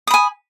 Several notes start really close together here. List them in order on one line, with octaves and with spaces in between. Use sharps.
D#6 B5 G#5